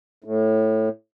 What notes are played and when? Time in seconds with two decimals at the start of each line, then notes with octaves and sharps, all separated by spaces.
0.24 A2